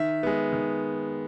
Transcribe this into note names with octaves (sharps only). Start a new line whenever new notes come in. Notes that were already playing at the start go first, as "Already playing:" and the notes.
Already playing: D#3 E5
G#3 B3
D#3